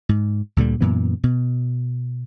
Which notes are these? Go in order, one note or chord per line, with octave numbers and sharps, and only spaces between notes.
G#2
D2 A#2 D3 G3
F#2 A#2 E3 B3
B2